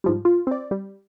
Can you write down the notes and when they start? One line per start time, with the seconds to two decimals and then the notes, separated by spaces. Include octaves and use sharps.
0.04 G#2 F3 G3
0.25 F4
0.47 C4 D5
0.71 G3